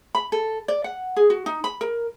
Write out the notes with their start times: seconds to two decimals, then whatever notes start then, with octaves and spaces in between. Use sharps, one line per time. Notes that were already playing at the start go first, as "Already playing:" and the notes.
0.15 B5
0.32 A4
0.68 D5
0.84 F#5
1.16 G#4
1.30 F#4
1.46 D#4
1.64 B5
1.81 A#4